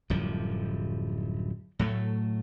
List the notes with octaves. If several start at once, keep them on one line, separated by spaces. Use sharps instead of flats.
D1 F#2 F3 G3
A2 F#3 A3